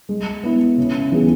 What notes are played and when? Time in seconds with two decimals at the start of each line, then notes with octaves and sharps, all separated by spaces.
0.09 G#3
0.43 B3 E4
0.78 C#3
1.12 E3 B3 G#4